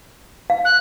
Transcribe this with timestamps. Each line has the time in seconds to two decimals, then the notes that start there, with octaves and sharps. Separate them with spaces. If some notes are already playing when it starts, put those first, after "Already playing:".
0.50 F5
0.65 F#6